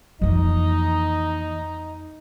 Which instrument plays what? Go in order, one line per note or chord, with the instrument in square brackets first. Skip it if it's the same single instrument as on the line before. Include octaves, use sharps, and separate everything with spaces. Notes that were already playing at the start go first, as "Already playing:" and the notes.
[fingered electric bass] F2 [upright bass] E3 A#3 [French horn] D#4 [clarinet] D#5